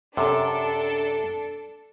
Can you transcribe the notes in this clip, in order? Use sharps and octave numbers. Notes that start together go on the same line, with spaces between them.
F#2 C3 D4 A4